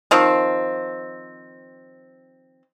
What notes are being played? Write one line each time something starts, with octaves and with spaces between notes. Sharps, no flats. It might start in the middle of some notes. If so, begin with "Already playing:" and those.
D#3 F3 C4